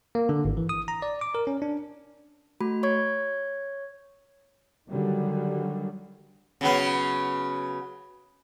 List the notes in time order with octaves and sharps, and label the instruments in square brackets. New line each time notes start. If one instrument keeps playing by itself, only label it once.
[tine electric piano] A#3
D3
G#1
E3
D#6
A#5
D5
D6
A#4
C#4
D4
[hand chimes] A3 F#4 B5
C#5 C#6 G#6
[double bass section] D3 D#3 F#3 G3
[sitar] C#3 F#3 B3